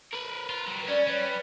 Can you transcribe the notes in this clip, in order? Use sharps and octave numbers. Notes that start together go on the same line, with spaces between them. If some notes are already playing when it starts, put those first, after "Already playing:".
A#4 B4
F4
F#3 G3
C#4 D5
G3 B4